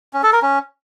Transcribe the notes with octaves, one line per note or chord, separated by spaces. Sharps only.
C#4
A4
A#4
C#4